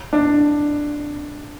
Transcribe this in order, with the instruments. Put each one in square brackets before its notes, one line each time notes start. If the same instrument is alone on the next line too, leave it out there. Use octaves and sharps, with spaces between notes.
[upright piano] D4